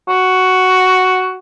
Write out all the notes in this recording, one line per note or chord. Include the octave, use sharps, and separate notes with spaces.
F#4